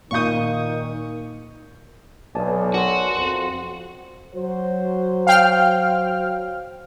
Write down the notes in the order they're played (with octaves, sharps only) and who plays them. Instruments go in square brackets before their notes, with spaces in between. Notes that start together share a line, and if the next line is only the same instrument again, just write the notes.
[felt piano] A#2 F5 G6 [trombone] D#3 [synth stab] C#6 D#6
[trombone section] B1 [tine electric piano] D5 G#5 A5
[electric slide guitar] F#4 [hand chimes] A#4 C6
[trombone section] F2 [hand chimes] C6
[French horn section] F#3 F#4 C5
[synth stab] F5 G5 F6